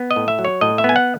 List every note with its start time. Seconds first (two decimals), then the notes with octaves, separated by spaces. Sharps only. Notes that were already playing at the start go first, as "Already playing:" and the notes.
Already playing: B3
0.11 D#5
0.16 A2
0.28 E5
0.39 F#3
0.45 C#5
0.61 A2 D#5
0.78 E5
0.84 B3
0.89 G#5
0.96 F#5